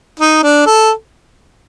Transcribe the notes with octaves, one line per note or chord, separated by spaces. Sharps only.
D#4
D4
A4